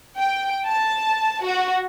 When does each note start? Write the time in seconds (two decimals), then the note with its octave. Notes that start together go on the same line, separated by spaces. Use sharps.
0.17 G5
0.67 A5
1.45 F#4